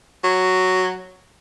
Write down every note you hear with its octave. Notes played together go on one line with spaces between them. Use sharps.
F#3